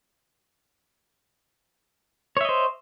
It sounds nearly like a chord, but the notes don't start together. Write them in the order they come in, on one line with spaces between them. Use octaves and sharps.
C#5 E5 D#5 C5